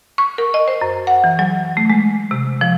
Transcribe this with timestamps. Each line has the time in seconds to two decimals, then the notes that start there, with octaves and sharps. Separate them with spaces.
0.18 C#6
0.38 A#4
0.54 D#5
0.68 C5
0.81 F#2
1.07 F#5
1.24 E3
1.39 F#3
1.77 A3
1.90 G#3
2.31 C3
2.61 F3